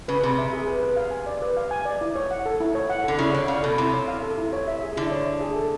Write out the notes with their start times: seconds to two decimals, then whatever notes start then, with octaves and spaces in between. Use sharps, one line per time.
0.08 C#3 B4
0.23 C3 G#4
0.38 E5
0.53 G#4
0.67 B4
0.83 B4
0.96 F5
1.11 G#5
1.27 D5
1.42 B4
1.57 F5
1.71 G#5
1.85 D5
2.01 E4
2.16 C#5
2.31 F#5
2.46 A4
2.60 E4
2.75 C#5
2.90 F#5
3.04 D3 A4
3.18 C#3 E4
3.34 D3 C#5
3.48 C#3 F5
3.63 B2 A4
3.78 C3 E4
3.93 C#5
4.08 F5
4.22 A4
4.38 E4
4.53 C#5
4.68 E5
4.82 G#4
4.97 D3 E4
5.11 C#5
5.26 E5
5.41 G#4
5.56 A4